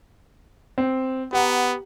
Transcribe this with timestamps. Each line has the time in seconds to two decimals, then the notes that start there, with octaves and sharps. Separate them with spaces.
0.78 C4
1.33 B3 G4 F#5 A#5